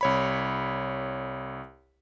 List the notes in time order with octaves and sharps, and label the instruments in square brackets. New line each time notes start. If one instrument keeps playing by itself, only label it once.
[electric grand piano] C2 C#5 B5